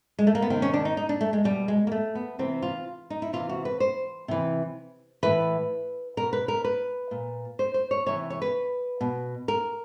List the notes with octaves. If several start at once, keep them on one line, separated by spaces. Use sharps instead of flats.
G#3
A3
A#3
B3
C3 D#3 C4
C#4
D4
D#4
D#4
D4
A3
G#3
B2 G3
G#3
A#3
A3
B3
C3 E3 C4
F4
D#4
E4
C3 E3 F4
F#4
B4
C5
C3 E3
A2 E3 B4
B2 A#4
B4
A#4
B4
A#2
C5
C5
C#5
C3 E3 C#5
C#5
B4
B2
A#4